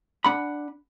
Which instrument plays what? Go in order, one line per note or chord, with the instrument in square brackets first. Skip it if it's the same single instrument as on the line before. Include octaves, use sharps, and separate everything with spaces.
[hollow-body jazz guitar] D4 F#5 B5